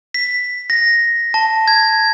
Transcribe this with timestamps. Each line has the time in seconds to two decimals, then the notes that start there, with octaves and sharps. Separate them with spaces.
0.14 B6
0.70 A#6
1.34 A5
1.68 G#6